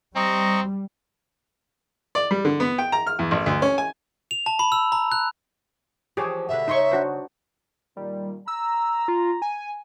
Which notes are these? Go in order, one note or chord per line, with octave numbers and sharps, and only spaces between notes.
G3 C4 D#5 A#5 C#6
D5
G3
D3
B3
G5
A#5
F6
E2
A1
D2
C#4
G#5
F7
A5
B5
E6
A#5
F#6
E3 F3 G4 G#4 C#5
B2 D3 B4 E5
C#3 D#4 C#5 C6 C#6
D4 F#4 C5
A#2 D#3 G3
A#5 E6
F4
G#5